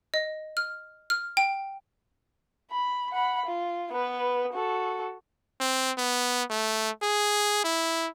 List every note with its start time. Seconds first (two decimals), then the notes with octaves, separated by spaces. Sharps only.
0.14 D#5
0.57 F6
1.10 F6
1.37 G5
2.71 B5
3.12 F#5 B5
3.46 F4
3.92 B3 B4
4.53 F#4 A4
5.60 C4
5.98 B3
6.50 A3
7.02 G#4
7.64 E4